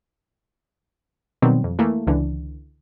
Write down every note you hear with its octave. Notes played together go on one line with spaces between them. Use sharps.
B2 D#3 F#3 G3 C4
F2
E3 A3 A#3
C#2 D3 E3